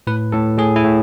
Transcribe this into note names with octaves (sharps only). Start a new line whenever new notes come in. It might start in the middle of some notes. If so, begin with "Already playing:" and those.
A2 B4
A2 A4
A2 G#4
E4
A2